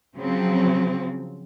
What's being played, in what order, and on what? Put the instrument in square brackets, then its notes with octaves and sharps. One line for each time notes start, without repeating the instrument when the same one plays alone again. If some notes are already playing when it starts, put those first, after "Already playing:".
[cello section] C#3 F3 F#3 C4